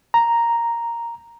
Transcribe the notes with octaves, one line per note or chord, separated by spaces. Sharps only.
A#5